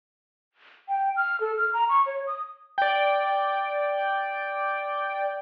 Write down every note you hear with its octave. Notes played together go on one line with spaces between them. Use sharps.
G5
F6
A4
F6
A#5
C#6
C#5
D#6
D5 G5